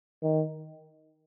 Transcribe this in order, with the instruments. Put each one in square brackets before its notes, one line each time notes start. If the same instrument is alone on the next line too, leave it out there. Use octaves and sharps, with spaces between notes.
[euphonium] D#3